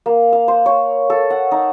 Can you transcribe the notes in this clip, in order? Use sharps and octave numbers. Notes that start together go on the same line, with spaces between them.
A#3
F5
C5
C#5
A4
F#5
D#4